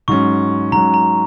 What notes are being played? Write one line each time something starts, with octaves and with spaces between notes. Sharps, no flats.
G#2 F#3 C#4 C#6
G#2 F#3 C#4 A#5
A#5